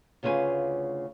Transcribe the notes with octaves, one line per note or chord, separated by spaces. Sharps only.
D2 C#3 F4 A#4 B4 G#5